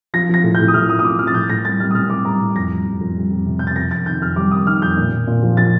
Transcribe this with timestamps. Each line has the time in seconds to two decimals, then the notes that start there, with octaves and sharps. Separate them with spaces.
0.14 F3 A#6
0.29 F3 A#6
0.44 A2
0.55 A2 G6
0.68 D#6
0.74 A2 F6
0.89 F3 D#6
0.99 D#6
1.04 F3 D6
1.19 F3 F6
1.27 A6
1.34 A2 G6
1.49 A2 A#6
1.65 G3 A6
1.80 G3 F6
1.91 D#6
1.94 A2 F6
2.10 A2 D6
2.25 G3 A#5
2.40 A2
2.55 F2 A#6
2.71 G3
2.85 F2
3.01 F2
3.16 G3
3.31 F2
3.46 C3
3.59 C3 G6
3.67 A6
3.76 F2 A#6
3.91 F2 A6
4.06 D#3 G6
4.21 F2 F6
4.36 G3 D6
4.51 F2 D#6
4.66 D#3 F6
4.82 F2 G6
4.97 A#2
5.12 A#2
5.27 A#2
5.43 F3
5.57 F3 A6